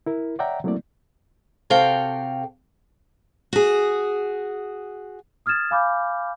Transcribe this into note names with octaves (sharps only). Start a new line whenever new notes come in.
E4 A#4
C#5 D5 E5 F#5 G5 A#5
F#3 A3 A#3 C4 E4 D5
C3 F#4 A4 F5 G5
F#4 G#4
D#6 F6 G#6 A6 E7
F5 G#5 B5 D6 F6 G6